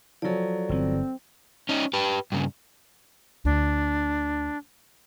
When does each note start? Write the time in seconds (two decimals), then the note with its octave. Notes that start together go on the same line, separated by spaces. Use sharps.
0.22 F3 F#3 A4 D5
0.69 G1 E3 C4
1.69 C#4 D#4
1.93 G4 B4
2.32 G2 C#3
3.45 D2 D4